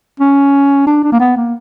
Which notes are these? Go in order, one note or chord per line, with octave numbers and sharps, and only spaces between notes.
C#4
D4
D4
A#3
B3
A#3